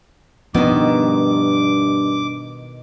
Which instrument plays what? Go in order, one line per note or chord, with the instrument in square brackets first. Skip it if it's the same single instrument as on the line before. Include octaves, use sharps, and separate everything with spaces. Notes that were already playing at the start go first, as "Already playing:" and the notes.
[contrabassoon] G2 [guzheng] B2 D#3 [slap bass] F3 B3 C#4 [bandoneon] D6